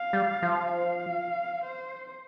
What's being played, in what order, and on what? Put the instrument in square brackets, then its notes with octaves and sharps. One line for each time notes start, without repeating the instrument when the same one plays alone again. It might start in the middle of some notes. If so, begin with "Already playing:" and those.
Already playing: [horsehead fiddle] F5
[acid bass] G3
F3
[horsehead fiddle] F5
C5